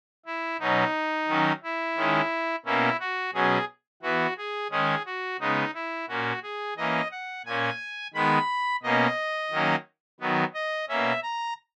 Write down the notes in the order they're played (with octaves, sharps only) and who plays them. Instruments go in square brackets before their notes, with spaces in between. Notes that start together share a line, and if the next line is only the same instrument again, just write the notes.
[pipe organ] E4
B2 F#3 C#4 D#4
D#3 F#3 C#4
E4
D#3 G#3 C#4
B2 A#3 C#4 E4
F#4
B2 F#3 C#4 G#4
E3 B3 F#4
G#4
D#3 G#3 C#4 G#4
F#4
C#3 G#3 B3 D#4
E4
A#2 A#3 C#4 F#4
G#4
E3 A#3 C#4 D#5
F#5
A#2 A#3 C#4 G#5
D#3 G#3 B3 B5
B2 A#3 C#4 D#5
D#3 F#3 A#3 C#4
D#3 F#3 B3
D#5
B2 A#3 C#4 E5
A#5